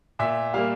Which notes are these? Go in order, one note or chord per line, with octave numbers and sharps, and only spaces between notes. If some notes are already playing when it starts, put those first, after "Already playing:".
A#2 E5
G3 A#3 F5